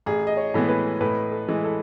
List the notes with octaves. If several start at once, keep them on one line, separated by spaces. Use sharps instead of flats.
A1 G#4
D#5
C#5
A2 E3 G#3 B3
B4
A2 B4
A4
E3 G#3
A4